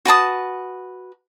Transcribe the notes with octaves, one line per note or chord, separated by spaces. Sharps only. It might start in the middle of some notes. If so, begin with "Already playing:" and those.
F#4 B4 A5 D#6